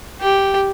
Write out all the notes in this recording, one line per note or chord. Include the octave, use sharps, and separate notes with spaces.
G4